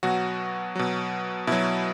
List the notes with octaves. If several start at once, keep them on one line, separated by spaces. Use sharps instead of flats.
B2 F#3 F#4
B2 F#3
B2 F#3 E4